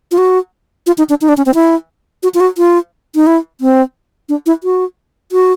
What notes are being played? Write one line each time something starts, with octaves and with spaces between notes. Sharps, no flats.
F4
F#4
F4
D#4
D4
D#4
D4
C#4
C4
E4
F#4
F4
F#4
F4
D#4
E4
C4
D4
E4
F#4
F#4